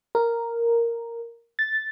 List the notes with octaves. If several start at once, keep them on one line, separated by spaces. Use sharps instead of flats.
A#4
A6